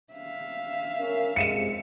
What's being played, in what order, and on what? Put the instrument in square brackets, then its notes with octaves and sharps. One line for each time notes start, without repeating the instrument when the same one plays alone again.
[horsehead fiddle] E5 F5
[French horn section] C#4 A#4
[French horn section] F2 C3 G#3 [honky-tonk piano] C#7 D#7 E7